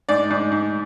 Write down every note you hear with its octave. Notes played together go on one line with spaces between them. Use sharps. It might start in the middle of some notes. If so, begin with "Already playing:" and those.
G#2 D5
G#2
G#2